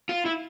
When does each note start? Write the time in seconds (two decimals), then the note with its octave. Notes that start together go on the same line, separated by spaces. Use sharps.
0.09 F4
0.26 E4